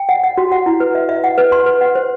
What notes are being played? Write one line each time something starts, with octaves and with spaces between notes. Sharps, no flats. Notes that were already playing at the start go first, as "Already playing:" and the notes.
Already playing: G5
F#5
F#5
F#4
F#5
E4
B4
E5
E5
F#5
B4
C6
B4
F#5
C5